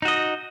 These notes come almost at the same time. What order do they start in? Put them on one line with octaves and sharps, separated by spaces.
D#4 F#4 D#5